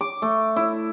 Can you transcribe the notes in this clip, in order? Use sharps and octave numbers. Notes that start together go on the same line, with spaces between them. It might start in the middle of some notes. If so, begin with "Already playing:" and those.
D6
A3
E4